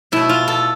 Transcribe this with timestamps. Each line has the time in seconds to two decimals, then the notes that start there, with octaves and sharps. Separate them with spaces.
0.12 B2 A3 E4
0.29 F4
0.48 A4